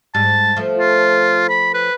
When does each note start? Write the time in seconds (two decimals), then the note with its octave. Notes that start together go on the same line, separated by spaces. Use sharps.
0.15 G#2 G3 A5
0.56 F3 A3
0.79 F4
1.49 B5
1.74 B4